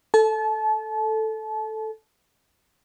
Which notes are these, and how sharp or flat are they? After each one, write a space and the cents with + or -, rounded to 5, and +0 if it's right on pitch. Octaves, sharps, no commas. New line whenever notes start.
A4 +0 A5 -30